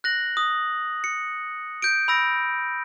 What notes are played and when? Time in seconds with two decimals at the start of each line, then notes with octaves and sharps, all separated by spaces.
0.04 F#6 A#6 F#7
0.37 D#6
1.04 C#7
1.82 G6 D7
2.08 B5 E6 A#6 D7